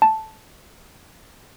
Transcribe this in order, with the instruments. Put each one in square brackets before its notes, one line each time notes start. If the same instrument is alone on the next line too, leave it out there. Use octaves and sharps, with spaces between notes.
[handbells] A5